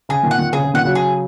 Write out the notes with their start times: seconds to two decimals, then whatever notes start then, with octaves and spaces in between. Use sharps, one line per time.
0.09 C#3 G#4
0.23 A#2 D#3
0.31 F#5
0.38 A#2 D#3
0.53 C#3 G#4
0.64 C#3
0.74 A#2 D#3 F#5
0.85 C#3 F#3
0.95 G#4